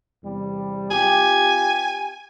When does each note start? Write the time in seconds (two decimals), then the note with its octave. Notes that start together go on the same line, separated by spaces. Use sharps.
0.23 E2 C3 G3
0.91 C4 F4 G4 G#5